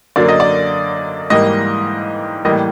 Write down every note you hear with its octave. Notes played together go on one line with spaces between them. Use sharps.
F#2 D3 F#3 A#3 D5
D#5
D5
G#2 E3 G3 A#3 D#5
A2 E3 G3 A#3 D#5